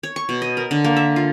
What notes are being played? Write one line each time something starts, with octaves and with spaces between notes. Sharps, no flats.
C#5
C#6
B2
D#5
A#4
D3
A#3
E5
F4